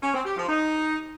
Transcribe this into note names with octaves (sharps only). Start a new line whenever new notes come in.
C#4
C4
G4
F3
D#4